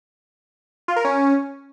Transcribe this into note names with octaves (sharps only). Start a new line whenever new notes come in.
F4
A#4
C#4